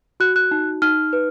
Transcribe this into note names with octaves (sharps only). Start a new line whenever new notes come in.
F#4 F#6
F#6
D#4
D#4 F6
B4